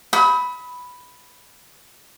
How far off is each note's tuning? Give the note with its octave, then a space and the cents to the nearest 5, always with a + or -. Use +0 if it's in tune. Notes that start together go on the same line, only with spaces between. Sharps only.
B5 +0 D#6 +45